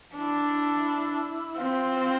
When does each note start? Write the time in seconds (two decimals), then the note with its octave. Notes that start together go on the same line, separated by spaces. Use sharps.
0.16 D4 E4
1.58 C4 F4